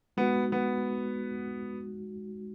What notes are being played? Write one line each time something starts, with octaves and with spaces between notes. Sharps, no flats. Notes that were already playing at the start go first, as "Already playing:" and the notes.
G#3 B3 D#4 F#4
B3